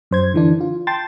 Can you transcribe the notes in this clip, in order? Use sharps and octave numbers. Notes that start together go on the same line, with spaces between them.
F#2 C5 G#6
D3 E3 D4
F4
G5 A5 C6 A6